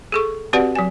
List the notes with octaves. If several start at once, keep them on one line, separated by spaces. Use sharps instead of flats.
G#4 A4 C#6
C4 F#4 G4 B4 D5 F#5
F#3 G#5